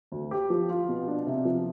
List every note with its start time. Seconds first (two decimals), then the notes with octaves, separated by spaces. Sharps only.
0.12 D2
0.31 G4
0.50 F3
0.70 F4
0.89 B2
1.08 D4
1.27 C3
1.45 F3